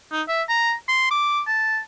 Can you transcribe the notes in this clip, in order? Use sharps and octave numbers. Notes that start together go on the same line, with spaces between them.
D#4
E5
A#5
C6
D6
A5